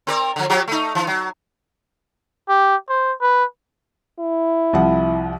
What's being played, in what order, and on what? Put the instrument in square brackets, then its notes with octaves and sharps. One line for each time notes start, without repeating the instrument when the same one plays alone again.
[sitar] C4 A#4 D5
D3 F3
F3 F#3 G4
A3 D#4
E3
F#3
[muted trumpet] G4
C5
B4
[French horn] E4
[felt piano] C2 F3 F#5